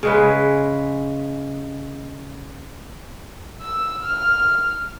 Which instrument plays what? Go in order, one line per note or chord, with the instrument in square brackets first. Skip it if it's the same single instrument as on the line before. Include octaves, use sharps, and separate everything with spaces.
[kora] C#3 G#3 B4
[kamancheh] E6
F6